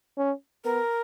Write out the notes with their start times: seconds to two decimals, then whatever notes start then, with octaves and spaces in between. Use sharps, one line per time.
0.17 C#4
0.64 B3 A#4